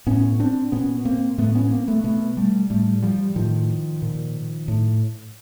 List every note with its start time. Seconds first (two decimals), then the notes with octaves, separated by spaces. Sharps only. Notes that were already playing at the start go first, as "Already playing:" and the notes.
0.07 A2 B3 C#4
0.40 C4 D4
0.72 A#2 B3 C#4
1.05 A#3 C4
1.38 A2 A3 B3
1.55 B3 C#4
1.71 A#3 C4
1.88 A3 B3
2.04 B2 A3 B3
2.37 G3 A3
2.70 A2 G3 A3
3.02 F3 G3
3.35 A2 D#3 F3
4.02 A#2
4.68 A2